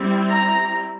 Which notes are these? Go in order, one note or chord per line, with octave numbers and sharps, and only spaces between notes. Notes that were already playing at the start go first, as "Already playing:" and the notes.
Already playing: G3 C4 E4
A#5